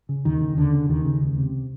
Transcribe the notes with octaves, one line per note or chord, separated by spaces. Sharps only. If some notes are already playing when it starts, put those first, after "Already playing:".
C#3
D#2 D#3
C#3
D#2 D3
C#3
D#2 D#3
C#3
C#2
C3